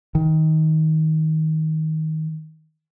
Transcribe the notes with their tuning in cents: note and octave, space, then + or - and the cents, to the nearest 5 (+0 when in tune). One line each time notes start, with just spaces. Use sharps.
D#3 +20